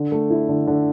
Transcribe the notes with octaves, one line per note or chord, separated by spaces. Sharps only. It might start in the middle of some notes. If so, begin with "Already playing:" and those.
Already playing: D3
A3
E4
D3
D3